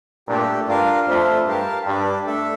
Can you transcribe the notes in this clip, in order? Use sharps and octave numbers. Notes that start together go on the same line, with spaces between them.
G2 A#2 A3 D4 G4
G2 D4 F4 A#4 F5
F2 A3 D4 F4 C5 E5
G2 G4 A#4 F5 A5
G2 D4 G4 D5
A3 D4 A4 E5